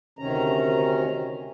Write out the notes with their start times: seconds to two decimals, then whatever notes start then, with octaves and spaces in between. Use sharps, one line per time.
0.19 D2 C3 D#3 C#4 A#5